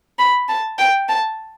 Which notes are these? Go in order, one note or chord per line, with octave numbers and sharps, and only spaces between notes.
B5
A5
G5
A5